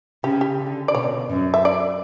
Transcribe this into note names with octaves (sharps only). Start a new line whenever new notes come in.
C#3 G4
G4
D3
D5
B2 C#5
F#2
E5
D5